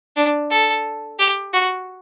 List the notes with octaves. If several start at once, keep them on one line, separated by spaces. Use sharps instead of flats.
D4
A4
G4
F#4